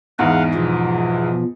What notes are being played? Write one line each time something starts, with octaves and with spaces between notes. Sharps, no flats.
E2 G#2 E3 F5 F#5
B2 F3